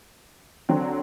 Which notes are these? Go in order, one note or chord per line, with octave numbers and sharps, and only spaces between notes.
D3 F#3 C4